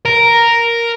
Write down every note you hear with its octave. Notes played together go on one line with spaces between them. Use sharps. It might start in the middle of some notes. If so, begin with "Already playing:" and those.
A#4